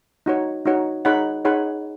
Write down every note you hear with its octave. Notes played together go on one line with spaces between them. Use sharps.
D#4 F#4 C#5
D#4 F#4 C#5
D#4 G#4 C#5 F#5 B5
D#4 G#4 C#5 F#5 B5